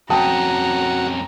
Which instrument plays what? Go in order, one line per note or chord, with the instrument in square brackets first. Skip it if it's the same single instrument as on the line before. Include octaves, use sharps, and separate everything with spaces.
[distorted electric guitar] F2 C#4 [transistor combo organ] F#4 [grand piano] G5 A5 D#6 [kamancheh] A#5